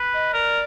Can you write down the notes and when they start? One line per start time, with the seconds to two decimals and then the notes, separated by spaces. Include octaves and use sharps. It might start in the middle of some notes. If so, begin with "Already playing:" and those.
Already playing: B4
0.14 D#5
0.33 A#4 D5